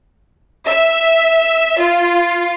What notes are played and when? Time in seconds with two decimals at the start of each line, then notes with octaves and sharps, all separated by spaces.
0.68 E5
1.80 F4